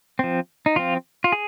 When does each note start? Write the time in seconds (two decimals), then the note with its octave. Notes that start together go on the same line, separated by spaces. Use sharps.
0.19 F3 C4
0.66 D#4
0.76 F3 C4 F4
1.24 F4
1.32 G#4